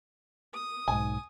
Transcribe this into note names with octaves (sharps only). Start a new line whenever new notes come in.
D#6
B1 G#2 G#5